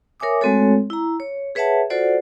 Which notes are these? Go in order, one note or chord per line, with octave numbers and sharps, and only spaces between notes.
A#4 C#5 E5 G#5 D6 D#6
G#3 A3 C4 F#4 A4 C#5
E4 A#5
C#5
G#4 B4 C#5 E5 F#5 A5
F4 F#4 A4 C5 D5 F#5